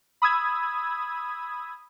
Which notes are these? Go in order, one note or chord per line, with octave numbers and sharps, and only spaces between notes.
B5 D#6 E6 G#6